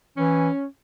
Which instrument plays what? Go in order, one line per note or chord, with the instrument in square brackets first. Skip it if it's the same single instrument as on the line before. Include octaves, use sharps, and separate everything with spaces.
[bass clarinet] E3 [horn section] C#4